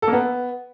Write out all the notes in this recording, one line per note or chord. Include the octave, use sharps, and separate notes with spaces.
A4
A#3
B3